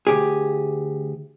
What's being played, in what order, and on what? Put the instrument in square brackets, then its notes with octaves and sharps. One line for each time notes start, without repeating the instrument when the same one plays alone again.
[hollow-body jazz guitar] D2 G4 G#4